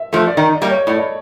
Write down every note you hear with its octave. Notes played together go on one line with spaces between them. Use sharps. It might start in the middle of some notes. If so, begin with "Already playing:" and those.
Already playing: E5
F3 A3
D5
D#3 D#5
D5
G3 A#3
C#5
A2 D5
D#5